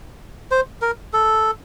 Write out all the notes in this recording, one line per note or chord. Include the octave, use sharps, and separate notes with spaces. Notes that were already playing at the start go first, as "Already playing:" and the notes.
C5
A#4
A4